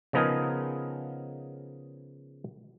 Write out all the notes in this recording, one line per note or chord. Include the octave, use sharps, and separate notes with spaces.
C#3 F3 B3 D#4 G#4 A#4